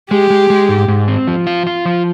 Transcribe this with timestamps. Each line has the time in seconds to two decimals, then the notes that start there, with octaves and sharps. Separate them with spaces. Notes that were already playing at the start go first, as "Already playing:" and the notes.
0.11 G#3 G4
0.30 G#3
0.50 G#3
0.69 G#2
0.88 G#2
1.08 C4
1.27 F3
1.47 F4
1.67 F4
1.86 F3